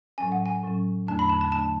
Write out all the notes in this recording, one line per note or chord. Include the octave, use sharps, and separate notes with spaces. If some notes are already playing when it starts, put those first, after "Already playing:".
A2 F#3 C#4 G#5
F#5
G#5
A2 F#3 C#4
E2 D3 A3 D4 A5
B5
A5
A5
D3 A3 D4 A5